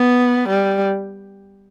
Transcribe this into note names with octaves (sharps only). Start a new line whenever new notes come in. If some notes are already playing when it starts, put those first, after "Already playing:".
Already playing: B3
G3